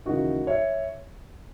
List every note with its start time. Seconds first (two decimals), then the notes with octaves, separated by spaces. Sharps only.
0.06 D#2 C#3 E3 G#3 D#4 F#4
0.47 C#5 E5